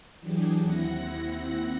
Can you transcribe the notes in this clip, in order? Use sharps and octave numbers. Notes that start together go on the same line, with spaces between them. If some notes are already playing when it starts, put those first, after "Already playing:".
E3 F#3 D4 G4 G#4
D#2 C4 E4 F#5 A#6